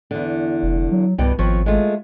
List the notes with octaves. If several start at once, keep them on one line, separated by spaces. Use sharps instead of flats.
E2 D3
F1
F#3
C2 G2 B2 G3
G#1 F2 F3 C#5
G#3 A3 F4